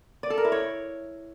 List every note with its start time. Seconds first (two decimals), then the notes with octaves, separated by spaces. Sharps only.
0.23 D5
0.30 A4
0.38 A#4
0.45 E4
0.52 C#5